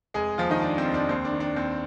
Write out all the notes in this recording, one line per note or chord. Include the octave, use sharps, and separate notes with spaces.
F1 G#3 G#4
D#2 F3 F4
D#3 D#4
D#3 D4
C4
F1
D4
D#2 C4
D4
D#3
D4
D#2 C4